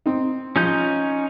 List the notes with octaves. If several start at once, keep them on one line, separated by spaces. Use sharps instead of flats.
C4 D#4
F3 C#4 D#4 G6